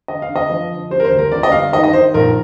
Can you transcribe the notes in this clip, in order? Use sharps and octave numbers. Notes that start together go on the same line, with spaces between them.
D3 D#5
F5
D3
D#5
F3
D3
G3 C5
A#4
C5
D2
A#4
G1 D5
D#5
G2 F5
D#3 D#5
D#5
D#3 C5
A#1 A#4